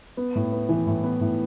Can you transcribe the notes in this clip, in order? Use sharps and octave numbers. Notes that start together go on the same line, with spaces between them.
B3
A2
B3
E3
A2
B3
A2